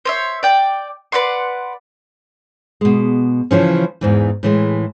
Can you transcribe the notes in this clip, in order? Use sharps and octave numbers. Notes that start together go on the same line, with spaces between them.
C5 C#5 E5
D5 G5
B4 D5 F#5 C6
B2 G#3
C#3 E3 F3 C#4
E2 G#2 E3
A2 E3 G#3